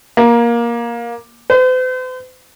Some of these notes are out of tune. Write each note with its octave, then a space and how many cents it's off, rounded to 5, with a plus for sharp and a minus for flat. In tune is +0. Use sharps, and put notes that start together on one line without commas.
A#3 +15
C5 -45